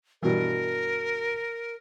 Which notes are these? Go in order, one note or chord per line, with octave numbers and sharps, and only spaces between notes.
G2 B2 E3 A#4